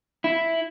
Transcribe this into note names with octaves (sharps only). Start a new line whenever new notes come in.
E4